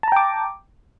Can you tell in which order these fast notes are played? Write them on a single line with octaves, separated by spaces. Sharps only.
A5 A#5 G5 D6